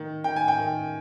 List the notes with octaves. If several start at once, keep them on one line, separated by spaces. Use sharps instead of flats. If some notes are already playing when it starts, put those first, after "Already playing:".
Already playing: D#3 A#3
D#3 G5
G#5
G5
D#3